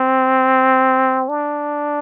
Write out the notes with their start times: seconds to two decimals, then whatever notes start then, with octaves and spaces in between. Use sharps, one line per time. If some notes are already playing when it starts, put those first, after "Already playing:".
Already playing: C4
1.29 D4